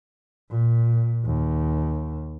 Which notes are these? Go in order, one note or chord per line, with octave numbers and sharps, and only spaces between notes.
A#2
D#2